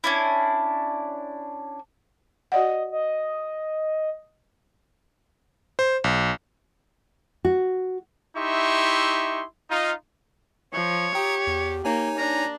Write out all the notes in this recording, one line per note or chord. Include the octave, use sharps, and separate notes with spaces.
C#4 D4 E4
F#4 D5 D#5 F#5
D#5
C5
B1
F#4
D#4 E4 G4 E5 C6 C#6
D#4 F4
F3 C#5
G4 G5 A#5 D#6
E2
A#3 D#4 C#5 G#5
D4 A#5